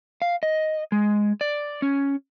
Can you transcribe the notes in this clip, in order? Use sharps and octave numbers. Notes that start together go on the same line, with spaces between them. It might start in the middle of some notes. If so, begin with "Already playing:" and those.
F5
D#5
G#3
D5
C#4